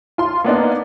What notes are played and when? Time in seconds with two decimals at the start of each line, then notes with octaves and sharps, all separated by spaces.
0.18 F4 C6
0.44 A#3 B3 D4 D#4